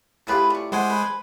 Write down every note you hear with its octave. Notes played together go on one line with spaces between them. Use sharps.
A2 E4 F4 G4 G#4 B4
D5 C#6
G#3 C5 F#5 G#5 C6 D6
B4